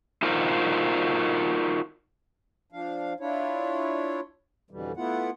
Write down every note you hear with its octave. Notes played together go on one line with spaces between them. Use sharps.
D#4 F4 F#4 A#4 C5
F3 D4 F5
D4 E4 F4 C#5
F2 B2 D3 E3 G3
A3 B3 E4 F4 F#5